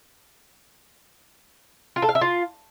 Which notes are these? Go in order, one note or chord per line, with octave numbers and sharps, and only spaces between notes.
F4
A4
F5
E5
F4